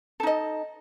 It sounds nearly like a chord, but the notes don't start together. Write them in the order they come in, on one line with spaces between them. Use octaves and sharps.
A4 D#4 D#5